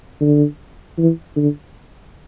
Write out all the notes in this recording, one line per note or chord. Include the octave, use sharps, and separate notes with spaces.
D3
E3
D3